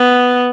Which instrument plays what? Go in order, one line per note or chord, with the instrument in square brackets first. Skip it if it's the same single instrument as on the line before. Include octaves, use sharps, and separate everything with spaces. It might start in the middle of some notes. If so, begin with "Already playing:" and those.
Already playing: [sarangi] B3